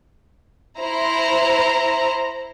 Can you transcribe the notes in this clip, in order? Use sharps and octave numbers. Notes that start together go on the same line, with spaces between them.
E4 C5 A#5